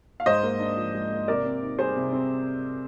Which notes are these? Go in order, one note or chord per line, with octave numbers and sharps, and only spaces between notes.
F5
G#2 C5 D#5
A#3
D4
F3
G#2
A#3
C3 A#4 D5
C4
D#4
G3 G#4 C5
C3
C4